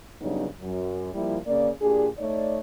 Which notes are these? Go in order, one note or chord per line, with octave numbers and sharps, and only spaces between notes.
G2 C#3 F#3 B3 D4 D#4
F#2 F#3
F3 G3 A#3 E4
C#3 A#3 C#4 D5
A#2 D4 G4 G#4
A3 D#4 C#5 D5